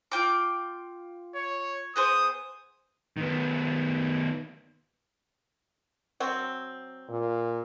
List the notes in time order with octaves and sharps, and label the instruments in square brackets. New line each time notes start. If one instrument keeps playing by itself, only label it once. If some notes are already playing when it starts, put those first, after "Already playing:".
[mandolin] F4 G5 D6
[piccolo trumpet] C#5
[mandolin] B3 G#4 C5 [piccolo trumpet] D#6
[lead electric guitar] D#3 B3
[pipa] F#3 C4
[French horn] A#2